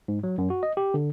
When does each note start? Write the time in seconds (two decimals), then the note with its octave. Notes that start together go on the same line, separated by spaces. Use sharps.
0.08 G#2
0.24 F#3
0.38 F#2
0.50 F#4
0.63 D#5
0.77 G4
0.94 D3